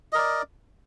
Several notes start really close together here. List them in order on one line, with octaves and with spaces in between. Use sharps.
D#5 A#4 D5